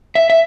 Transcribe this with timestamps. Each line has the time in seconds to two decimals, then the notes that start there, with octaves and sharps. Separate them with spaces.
0.15 E5
0.30 E5